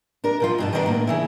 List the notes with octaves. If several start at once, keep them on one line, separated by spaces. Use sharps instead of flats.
D4 A#4
B2 F3 F4
G2 B2 A5
D#3 G3 B3 D4 F4 A#4
A2 A#3
C#3 E3 E4